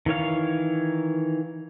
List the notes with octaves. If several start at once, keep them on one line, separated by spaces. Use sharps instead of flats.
D#3 E3 C#5 F5